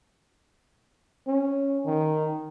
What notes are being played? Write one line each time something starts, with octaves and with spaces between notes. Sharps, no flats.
C#4
D#3